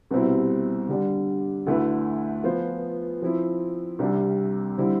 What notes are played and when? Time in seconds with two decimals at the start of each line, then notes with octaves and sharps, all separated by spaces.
0.11 C2 B2 G3 C4 E4
0.89 D3 G3 D4
1.66 D2 D3 A3 E4 B4
2.44 F3 B3 F4 C5
3.22 F3 C4 E4
3.99 C2 C3 G3 D4 G4
4.78 D3 G3 C4 E4